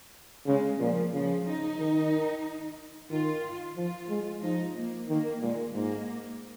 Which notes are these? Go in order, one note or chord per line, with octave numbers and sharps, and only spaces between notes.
C#3 G#3
A#2 F3
C#3 F3
D#4
D#3
D#3 F4
F3 F4
G#3
F3 D#4
A#3
D#3 A#3
A#2 G#3
G#2 A#3